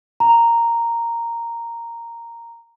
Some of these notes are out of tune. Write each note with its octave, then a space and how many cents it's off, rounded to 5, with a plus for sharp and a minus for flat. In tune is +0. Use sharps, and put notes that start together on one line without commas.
A#5 -5